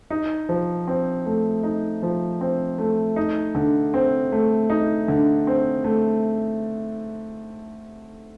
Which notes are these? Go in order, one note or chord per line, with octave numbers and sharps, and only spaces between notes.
D#4
F3
C4
A3
D#4
F3
C4
A3
D#4
D3
C4
A3
D#4
D3
C4
A3